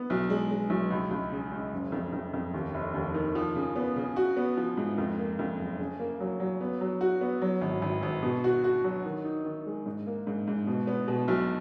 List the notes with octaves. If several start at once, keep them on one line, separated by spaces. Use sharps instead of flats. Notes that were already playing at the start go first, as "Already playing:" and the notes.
Already playing: B3
B1
G#3
G#3
B1
C#2
C#2
C#3
C#2
F#1
F2
F2
F2
D#2
F1
D#2
D#3
F3
C#3
B3
C#3
F#4
B3
F3
G#2
F2
A#3
F2
F#1
C#3
A#3
F#3
F#3
B3
F#3
F#4
B3
F#3
G#1
G#1
G#1
B2
F#4
F#4
F#3
D#3
D#4
D#3
G#3
G#2
A#3
G#2
G#2
B2
B3
B2
B1